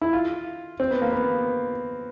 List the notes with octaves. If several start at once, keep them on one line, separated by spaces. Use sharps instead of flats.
E4
F4
C4
B3
A#3
B3